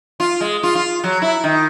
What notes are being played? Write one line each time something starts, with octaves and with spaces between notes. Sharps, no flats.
F4
G#3
F4
F4
F#3
E4
D#3